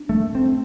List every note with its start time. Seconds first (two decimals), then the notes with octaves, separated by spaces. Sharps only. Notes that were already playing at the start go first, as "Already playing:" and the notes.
Already playing: D4
0.09 A3
0.35 C4